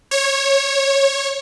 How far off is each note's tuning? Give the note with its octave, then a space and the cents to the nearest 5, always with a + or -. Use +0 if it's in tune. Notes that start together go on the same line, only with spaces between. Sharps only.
C#5 -15